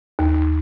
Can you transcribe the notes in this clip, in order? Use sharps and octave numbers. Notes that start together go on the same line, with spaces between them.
D#2